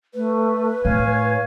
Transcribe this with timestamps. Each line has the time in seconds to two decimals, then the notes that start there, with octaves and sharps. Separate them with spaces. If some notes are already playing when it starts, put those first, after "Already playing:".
0.14 A3 B4
0.85 A2 C#5 F5 G#5